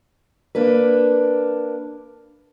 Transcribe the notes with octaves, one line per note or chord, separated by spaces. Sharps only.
A#3 D4 B4